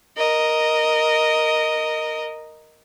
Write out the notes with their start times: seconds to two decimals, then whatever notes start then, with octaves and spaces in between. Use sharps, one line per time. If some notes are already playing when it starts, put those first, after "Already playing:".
0.17 A#4 D#5